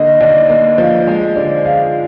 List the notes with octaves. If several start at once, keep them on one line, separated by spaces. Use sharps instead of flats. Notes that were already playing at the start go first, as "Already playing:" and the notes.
Already playing: D3 A#3 D#5
D#2 D5
A#3 D#5
F3 F5
G#3 D#5
D3 D5
G#4 F5